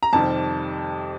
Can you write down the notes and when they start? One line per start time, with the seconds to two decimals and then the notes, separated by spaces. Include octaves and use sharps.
0.03 A#5
0.13 F2 C3 D#3 G3 A5